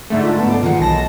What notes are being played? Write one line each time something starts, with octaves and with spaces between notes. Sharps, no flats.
G#2 D3 A3 E5
F4
B3 A4
F#2 F4 D5
A#2 D#3 E3 G#3 F4 F#5
B1 D#5 A5 A#6